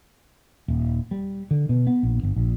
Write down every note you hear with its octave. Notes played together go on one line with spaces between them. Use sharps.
D#1
G3
D3
B2
B3
A#1
G1
A#1